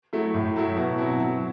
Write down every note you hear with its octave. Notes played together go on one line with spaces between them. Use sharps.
F#3 A3 E4
A2
F#3 A3 E4
B2
F#3 C4 E4
F#3